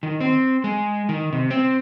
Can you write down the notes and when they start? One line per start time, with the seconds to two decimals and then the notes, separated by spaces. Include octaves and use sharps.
0.03 D#3
0.21 C4
0.64 G#3
1.09 D#3
1.33 C3
1.50 C4